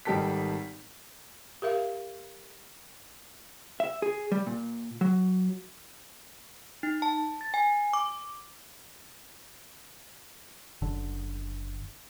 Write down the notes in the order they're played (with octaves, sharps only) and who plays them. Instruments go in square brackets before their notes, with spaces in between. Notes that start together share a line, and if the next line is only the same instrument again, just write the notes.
[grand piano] G#1 G3 D#4 G4 A4 B6
[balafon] G4 A#4 E5 F5
[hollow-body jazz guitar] E5
G#4
G3
A#2
F#3
[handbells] D#4
A5
A6
G#5
D6
[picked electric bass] F#1 D3